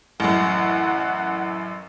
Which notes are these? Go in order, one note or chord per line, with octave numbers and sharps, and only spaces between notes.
A1 F#2 F#5